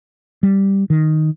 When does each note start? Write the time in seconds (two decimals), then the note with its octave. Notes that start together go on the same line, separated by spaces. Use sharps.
0.43 G3
0.90 D#3